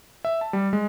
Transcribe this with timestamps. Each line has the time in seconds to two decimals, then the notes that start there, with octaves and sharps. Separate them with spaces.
0.25 E5
0.41 A5
0.53 G3
0.73 G#3